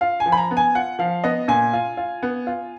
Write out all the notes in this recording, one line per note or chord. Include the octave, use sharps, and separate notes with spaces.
F4 F5
G#5
F3
B5
A#5
B3
G#5
F4 F#5
F3 F5
B3 D#5
A#2 G#5
F4
F4
B3
F4